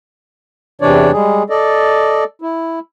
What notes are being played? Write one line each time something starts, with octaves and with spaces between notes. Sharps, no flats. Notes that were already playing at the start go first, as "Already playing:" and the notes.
E2 C3 E3 D4 C#5 D5
G3 G#3 G#4
A4 D5 D#5
E4